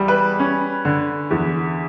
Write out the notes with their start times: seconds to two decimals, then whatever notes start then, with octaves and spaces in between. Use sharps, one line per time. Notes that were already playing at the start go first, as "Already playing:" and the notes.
Already playing: E2 G3
0.08 B4
0.39 C#4
0.85 D3
1.31 E2